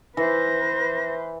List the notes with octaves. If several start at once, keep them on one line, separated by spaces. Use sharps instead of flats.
E3 B4 C5 A#6